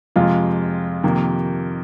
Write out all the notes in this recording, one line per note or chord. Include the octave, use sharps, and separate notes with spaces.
F2 C3 G#3 F4
F2 C3 D#3 A#3